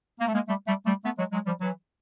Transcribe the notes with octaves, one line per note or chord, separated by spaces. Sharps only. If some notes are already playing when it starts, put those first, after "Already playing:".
A#3
A3
G#3 A#3
G3 A3
G3 A3
G3 A3
A3 B3
F#3 G#3
F#3 G#3
F3 G3
E3 F#3